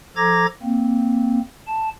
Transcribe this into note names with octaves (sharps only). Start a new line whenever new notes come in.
F3 A4 A#5 D6 G#6 A#6
A#3 C4
A5